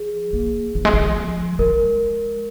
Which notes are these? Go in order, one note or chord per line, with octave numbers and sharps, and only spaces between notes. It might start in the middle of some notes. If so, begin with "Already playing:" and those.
Already playing: F3 G#4
A#3
F3
G#3
F3
G#3 A#4